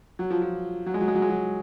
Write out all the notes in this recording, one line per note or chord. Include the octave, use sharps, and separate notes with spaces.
F#3
F3
F3
F#3
G#3
F#3
G#3
F#3
G#3
F#3